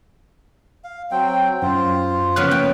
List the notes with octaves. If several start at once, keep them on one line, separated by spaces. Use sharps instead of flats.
F5
F#3 C4 G5
F#2 F4 C5
C#3 F3 B3 F6 F#6
A#3 G5